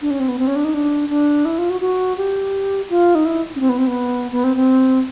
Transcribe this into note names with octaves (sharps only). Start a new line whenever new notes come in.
D4
C#4
C4
B3
C4
C#4
D4
D#4
D4
D4
E4
F4
F#4
F#4
G4
F4
D#4
E4
C#4
C4
B3
C4
B3
B3
C4
C4